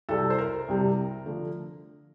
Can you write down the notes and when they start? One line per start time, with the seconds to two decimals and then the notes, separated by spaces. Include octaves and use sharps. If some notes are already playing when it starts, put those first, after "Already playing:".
0.09 C2 C3 G3 A4
0.30 C5
0.38 A#4
0.68 C2 C3 G3
1.26 D3 F3 A3